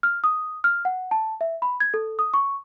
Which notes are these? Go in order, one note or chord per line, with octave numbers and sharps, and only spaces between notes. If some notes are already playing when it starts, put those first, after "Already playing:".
F6
D#6
F6
F#5
A5
E5
B5
G#6
A4
D#6
C#6